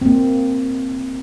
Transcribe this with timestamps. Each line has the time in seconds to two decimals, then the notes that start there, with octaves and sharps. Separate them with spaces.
0.01 C4
0.05 A#3